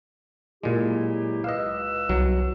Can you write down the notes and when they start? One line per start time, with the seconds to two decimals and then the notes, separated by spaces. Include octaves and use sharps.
0.63 A#2 F#3 G#3 E4 G4
1.44 C#2 B4 D#5 F5 E6
2.09 C2 F#3